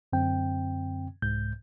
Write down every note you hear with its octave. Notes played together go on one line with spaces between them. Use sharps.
F#2 D3 C4 G5
C2 G#2 G6